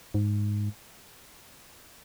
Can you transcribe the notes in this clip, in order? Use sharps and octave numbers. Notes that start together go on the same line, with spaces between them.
G#2